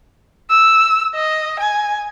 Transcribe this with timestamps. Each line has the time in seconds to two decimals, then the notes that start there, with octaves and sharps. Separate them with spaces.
0.50 E6
1.15 D#5
1.60 G#5